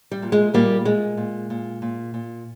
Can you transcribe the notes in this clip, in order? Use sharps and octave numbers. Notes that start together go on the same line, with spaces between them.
G3
A#2
G#3
A#2 G3 A#3
A#2 G#3
A#2
A#2
A#2
A#2